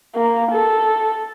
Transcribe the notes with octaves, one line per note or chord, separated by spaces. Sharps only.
A#3
A4